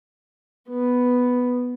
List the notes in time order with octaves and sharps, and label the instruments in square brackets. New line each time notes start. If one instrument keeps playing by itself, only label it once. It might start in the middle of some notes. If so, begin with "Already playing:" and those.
[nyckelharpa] B3